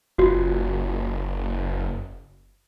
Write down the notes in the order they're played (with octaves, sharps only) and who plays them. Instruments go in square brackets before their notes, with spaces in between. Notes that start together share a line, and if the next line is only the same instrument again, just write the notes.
[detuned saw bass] F#1 [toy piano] F4 F#4